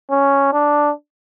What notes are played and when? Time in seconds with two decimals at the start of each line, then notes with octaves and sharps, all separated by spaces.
0.10 C#4
0.53 D4